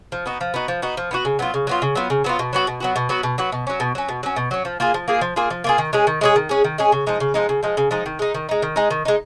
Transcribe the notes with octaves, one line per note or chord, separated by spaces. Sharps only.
F3
B3 D#4 F#4
F3
B3 D#4 F#4
F3
B3 D#4 F#4
F3
B3 D#4 F#4
C#3
F#3 B3 F4
C#3
F#3 B3 F4
C#3
F#3 B3 F4
C#3
F#3 B3 F4
B2
F#3 B3 F#4
B2
F#3 B3 F#4
B2
F#3 B3 F#4
B2
F#3 B3 F#4
B2
F#3 C#4
B2
F#3 C#4
B2
F#3 C#4
B2
F#3 C#4
F3
A#3 F4 G#4
F3
A#3 F4 G#4
F3
A#3 F4 G#4
F3
A#3 F4 G#4
D#3
G#3 C#4 G#4
D#3
G#3 C#4 G#4
D#3
G#3 C#4 G#4
D#3
G#3 C#4 G#4
C#3
F3 G#3 D#4
C#3
F3 G#3 D#4
C#3
F3 G#3 D#4
C#3
F3 G#3 D#4
D#3
G#3 D#4
D#3
G#3 D#4
D#3
G#3 D#4
D#3
G#3 D#4